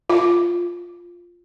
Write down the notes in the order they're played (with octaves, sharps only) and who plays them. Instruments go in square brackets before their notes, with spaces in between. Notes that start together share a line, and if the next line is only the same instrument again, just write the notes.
[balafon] F4